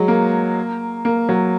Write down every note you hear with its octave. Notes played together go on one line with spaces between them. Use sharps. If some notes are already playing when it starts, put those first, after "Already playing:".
Already playing: F#3 G#3
A#3
A#3
F#3